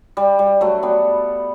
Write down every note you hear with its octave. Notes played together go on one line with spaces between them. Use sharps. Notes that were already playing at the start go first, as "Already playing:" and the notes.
G3
G3
F#3 A3
G3 B3